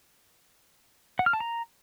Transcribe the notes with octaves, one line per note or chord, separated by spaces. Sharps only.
F#5
F6
A5
A#5